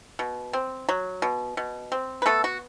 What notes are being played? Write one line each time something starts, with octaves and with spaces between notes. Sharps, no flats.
B2
C4
F#3
B2
B2
C4
B4
A3 B3 A4
F#4